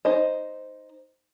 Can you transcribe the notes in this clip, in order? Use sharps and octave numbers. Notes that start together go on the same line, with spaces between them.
D#4 C5 D#5